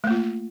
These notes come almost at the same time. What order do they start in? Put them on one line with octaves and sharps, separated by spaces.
A3 A#3 F4